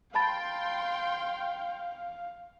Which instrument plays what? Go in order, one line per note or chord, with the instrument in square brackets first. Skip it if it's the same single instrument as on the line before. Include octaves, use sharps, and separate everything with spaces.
[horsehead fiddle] F5 [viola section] G5 C6 [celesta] A5 B5 A6